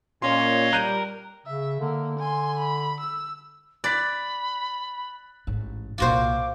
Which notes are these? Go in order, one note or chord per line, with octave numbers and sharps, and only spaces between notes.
A#2 C#4 C#5 D#5 F5 C6
G3 A#4 F#6 G6 D#7
C#3 E5
D3 A#3
G#5 C6
B5
E6
D5 B5 F#6 A6 B6
A1 G#2
C2 A#2 F4 F#4 C5 D6